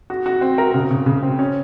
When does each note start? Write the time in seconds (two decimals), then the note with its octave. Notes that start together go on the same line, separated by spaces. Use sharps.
0.10 F#4
0.26 F#4
0.41 C4
0.58 A#4
0.74 C#3
0.91 C#3
1.06 C#3
1.22 C4
1.39 C#4